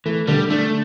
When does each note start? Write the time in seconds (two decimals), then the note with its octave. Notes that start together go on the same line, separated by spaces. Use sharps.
0.05 E3 A3
0.27 D3 G3
0.50 A3 D4